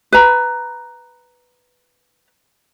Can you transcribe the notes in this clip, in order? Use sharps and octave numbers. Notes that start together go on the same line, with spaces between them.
B4 A#5